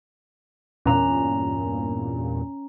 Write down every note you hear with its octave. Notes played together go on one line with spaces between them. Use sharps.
E2 G2 A#2 C#4 A#5